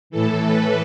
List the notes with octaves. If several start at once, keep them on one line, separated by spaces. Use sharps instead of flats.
A2 E3 A4
B4